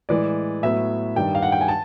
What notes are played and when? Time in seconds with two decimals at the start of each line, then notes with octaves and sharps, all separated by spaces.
0.09 A2 E3 G#3 D5
0.62 A2 F#3 B3 E5
1.16 G2 D#3 G3 G5
1.35 F5
1.42 F#5
1.52 G5
1.61 G#5
1.68 A5